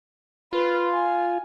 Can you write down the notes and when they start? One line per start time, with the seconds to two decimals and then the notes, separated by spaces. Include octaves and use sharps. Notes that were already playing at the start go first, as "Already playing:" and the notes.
0.53 F4 B4
0.91 G#5